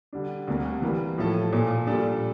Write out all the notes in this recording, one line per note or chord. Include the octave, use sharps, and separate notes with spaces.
D3 G3 D4
D2 C3 G3 A#3
E3 G3 A#3
A2 F3 A3 E4 A4
A#2 F3 A#3 F4 A4
A#2 G3 D4 A4